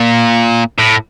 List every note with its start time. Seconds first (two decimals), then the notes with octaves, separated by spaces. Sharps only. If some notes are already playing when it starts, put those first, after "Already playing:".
Already playing: A#2
0.79 A2